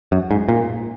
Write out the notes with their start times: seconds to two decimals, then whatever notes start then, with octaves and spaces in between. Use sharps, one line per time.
0.12 F#2
0.31 G#2
0.49 A#2